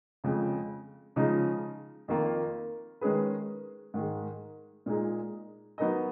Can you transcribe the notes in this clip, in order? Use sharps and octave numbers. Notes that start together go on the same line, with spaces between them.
F2 C#3 G#3
C#3 F3 G#3 D#4
F2 D#3 A#3 F4
D#3 G#3 C#4 G#4 B4
G#2 D#3 G#3
A#2 G#3 D#4 G#4
F#3 B3 D#4 A#4 D#5